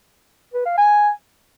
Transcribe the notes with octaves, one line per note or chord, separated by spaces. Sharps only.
B4
F5
G#5